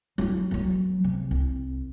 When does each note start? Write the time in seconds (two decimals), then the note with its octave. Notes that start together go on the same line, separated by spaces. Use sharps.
0.18 F#3 E4
0.51 F#3 B3
1.04 C3
1.31 C2